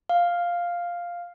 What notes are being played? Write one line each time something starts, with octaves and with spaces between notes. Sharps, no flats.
F5